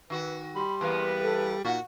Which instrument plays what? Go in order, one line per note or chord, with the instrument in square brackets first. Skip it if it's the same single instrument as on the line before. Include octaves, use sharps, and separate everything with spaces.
[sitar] D#3 F#4 [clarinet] B4
[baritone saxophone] G3 [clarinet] B5 [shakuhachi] C6
[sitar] E2 A#3 B3 [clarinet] B4
[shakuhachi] A4
[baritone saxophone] A#2 [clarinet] D#4 [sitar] F#4 [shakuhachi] F#5